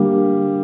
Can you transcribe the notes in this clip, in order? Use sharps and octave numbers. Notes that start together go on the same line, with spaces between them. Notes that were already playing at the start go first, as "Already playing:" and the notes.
Already playing: D3 G3 A#3